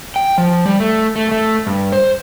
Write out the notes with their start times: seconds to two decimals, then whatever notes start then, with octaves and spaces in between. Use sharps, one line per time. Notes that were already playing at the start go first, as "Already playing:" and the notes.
0.16 G5
0.38 F3
0.66 G3
0.80 A3
1.16 A3
1.32 A3
1.67 G2
1.92 C5